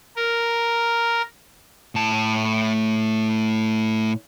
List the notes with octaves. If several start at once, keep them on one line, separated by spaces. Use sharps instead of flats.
A#4
A2 A5